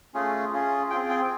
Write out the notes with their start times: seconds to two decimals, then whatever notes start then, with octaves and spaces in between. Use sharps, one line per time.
0.14 A3 C#4 F4 G#4
0.53 C#4 F4 G#4
0.90 C4 F4 G#4 G5
1.09 G5